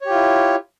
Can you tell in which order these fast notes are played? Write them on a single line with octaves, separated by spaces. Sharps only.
C#5 G4 F4 E4